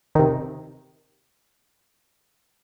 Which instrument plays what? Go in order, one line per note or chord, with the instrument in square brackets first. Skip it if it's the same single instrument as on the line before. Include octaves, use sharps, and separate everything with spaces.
[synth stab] C3 D#3